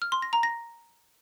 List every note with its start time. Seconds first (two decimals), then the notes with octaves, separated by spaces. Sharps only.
0.02 F6
0.12 C6
0.22 A#6
0.33 A#5
0.43 A#6